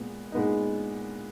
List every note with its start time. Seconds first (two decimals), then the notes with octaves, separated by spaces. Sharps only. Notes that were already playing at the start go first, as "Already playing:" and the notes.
Already playing: A#2 G#3 B3
0.32 A#2 G#3 B3 D#4